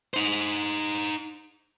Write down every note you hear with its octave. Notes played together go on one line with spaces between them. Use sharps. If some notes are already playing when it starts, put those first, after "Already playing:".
D#4 C5